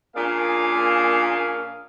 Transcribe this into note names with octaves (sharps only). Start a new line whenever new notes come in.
A#2 A#3 C#4 D4 G#4 F5